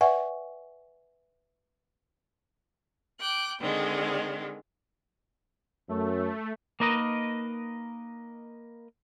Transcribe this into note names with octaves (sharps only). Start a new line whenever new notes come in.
B4 D5 E5 F#5 G#5 C#6
G5 D6 F#6
D3 D#3 G#3 C4
F#2 A3
A#3 D#4 A#4 B4 D#5